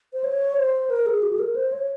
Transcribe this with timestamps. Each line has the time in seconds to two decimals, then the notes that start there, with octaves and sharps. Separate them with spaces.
0.13 C5
0.24 C#5
0.58 C5
0.90 A#4
1.06 G#4
1.22 F#4
1.33 G#4
1.39 A#4
1.56 C5
1.72 C#5